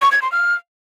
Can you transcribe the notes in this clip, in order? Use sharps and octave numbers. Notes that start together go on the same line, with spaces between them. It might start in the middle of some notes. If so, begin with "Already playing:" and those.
C#6
G#6
C6
F6